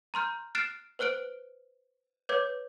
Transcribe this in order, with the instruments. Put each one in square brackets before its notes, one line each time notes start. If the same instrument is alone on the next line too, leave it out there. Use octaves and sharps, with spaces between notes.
[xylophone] A#5 C6 F6 G6
F6 F#6 A6 C7 D7 E7
B4 C5 F6 F#6 D7
B4 C#5 D6 G6 G#6